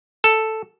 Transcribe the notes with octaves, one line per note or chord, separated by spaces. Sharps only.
A4